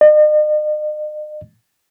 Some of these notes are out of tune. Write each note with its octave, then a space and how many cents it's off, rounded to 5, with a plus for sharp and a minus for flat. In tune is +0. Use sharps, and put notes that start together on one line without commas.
D#5 -45